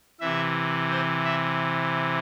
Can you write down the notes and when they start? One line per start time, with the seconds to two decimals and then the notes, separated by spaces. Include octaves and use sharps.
0.20 C3 E3 E5
0.90 C5
1.24 E5